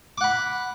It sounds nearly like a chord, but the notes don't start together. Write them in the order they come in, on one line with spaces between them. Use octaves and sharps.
D6 F#5 B5